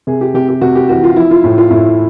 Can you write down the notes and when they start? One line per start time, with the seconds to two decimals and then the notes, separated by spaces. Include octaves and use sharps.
0.07 C3 G#4
0.21 G4
0.34 C3 G4
0.48 G4
0.61 C3 F#4
0.75 G4
0.89 E3 F#4
1.04 F4
1.16 F3 E4
1.31 F4
1.44 A2
1.58 F4
1.70 A2 E4